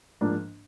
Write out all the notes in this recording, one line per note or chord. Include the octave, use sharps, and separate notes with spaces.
G#2 F3 A#3 D4